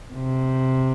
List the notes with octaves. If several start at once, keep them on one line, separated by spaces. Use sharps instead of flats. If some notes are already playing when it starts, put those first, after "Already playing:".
C3